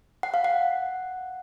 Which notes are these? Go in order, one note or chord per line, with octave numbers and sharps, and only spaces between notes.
F#5
F5
F#5